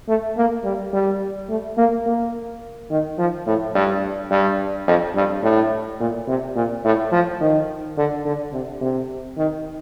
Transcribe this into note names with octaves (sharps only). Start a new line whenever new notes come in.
A3
A#3
G3
G3
A3
A#3
A#3
D#3
F3
A2
G2
G2
F2
G2
A2
A#2
C3
A#2
A2
F3
D#3
D3
D3
C3
C3
D#3